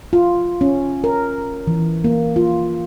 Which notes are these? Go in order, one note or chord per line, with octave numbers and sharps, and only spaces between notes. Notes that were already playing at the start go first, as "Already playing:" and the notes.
F4
C#4
A#4
E3
A#3
F4